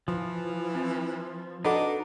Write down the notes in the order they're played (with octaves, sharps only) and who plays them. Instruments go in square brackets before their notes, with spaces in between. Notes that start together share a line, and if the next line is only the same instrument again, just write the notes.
[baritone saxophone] E3 [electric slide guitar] F3
[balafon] C4
[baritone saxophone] D4 [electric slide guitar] D#4 [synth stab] F#4 A4 B4 [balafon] D#5 F#5 D6